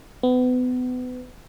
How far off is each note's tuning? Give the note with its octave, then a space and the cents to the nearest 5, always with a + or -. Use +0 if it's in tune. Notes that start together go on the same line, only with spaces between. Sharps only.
B3 +30